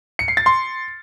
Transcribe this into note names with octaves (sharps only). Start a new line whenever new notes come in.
C#7
C7
A6
C6